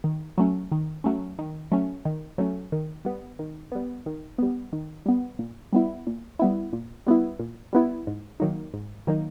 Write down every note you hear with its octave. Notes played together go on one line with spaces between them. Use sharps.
D#3
F#3 A3 C#4
D#3
F#3 A3 C#4
D#3
F#3 A3 C#4
D#3
F#3 A3 C#4
D#3
G3 B3
D#3
G3 B3
D#3
G3 B3
D#3
G3 B3
A#2
G3 B3 E4
A#2
G3 B3 E4
A#2
G3 B3 E4
A#2
G3 B3 E4
G#2
D#3 F#3 A#3 D#4
G#2
D#3 F#3 A#3 D#4